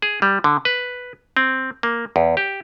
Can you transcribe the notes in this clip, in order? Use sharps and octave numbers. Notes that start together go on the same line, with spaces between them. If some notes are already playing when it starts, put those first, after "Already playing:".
G#4
G3
D3
B4
C4
A#3
E2
G4